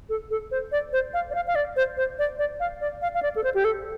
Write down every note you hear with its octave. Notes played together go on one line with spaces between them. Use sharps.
A4
A4
C5
D5
C5
F5
D5
F5
F5
D5
C5
C5
D5
D5
F5
D5
F5
F5
D5
A4
C5
G4
A4